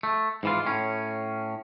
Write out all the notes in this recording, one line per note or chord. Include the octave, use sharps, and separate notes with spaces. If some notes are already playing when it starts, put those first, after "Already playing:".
A3
G#2 E3 F4
A2 C#4